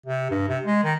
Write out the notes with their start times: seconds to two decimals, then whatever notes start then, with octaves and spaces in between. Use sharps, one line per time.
0.06 C3
0.31 G2
0.48 C3
0.65 G#3
0.84 D#3